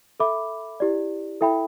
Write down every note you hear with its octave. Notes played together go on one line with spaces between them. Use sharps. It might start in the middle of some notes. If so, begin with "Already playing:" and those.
A4 E5 B5 D6
E4 G4 D5
E4 A4 E5 G5 B5